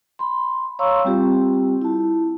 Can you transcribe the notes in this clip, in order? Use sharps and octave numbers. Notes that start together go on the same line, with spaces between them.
B5 C6
C#5 F5 A#5 C6 C#6 E6
G3 C4 F4 G4
E4 A5